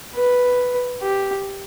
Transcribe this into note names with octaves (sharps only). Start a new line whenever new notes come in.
B4
G4